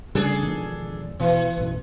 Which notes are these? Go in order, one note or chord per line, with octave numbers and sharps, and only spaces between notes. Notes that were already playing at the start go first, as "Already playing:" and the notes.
C#3 G3 A3 D4 G#4 A4
E1 D#3 F3
B2 E3
A1 F#2 B2